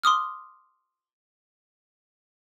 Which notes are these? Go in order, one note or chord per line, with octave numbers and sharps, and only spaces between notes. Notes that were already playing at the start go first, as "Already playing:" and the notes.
C6 D6 D#6 F6